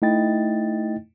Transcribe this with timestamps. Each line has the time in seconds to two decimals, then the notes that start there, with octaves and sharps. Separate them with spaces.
0.02 A3 D#4 E4 D#5 G5 A6